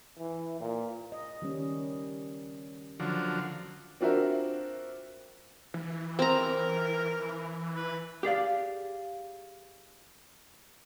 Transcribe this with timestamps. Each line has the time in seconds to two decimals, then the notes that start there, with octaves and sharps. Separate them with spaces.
0.19 E3
0.60 A#2
1.12 D#5
1.42 D#3 G3 C#4
3.00 D3 F3 F#3
4.01 C4 D4 F4 F#4 A#4 E5
5.74 E3
6.19 C4 A#4 A#5
7.76 B4
8.23 G4 G#4 D5 F5